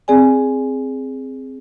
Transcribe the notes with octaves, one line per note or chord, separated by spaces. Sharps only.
C4 G#4 D5 G#5